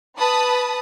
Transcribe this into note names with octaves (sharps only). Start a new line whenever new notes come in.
B4 A5 B5 D#6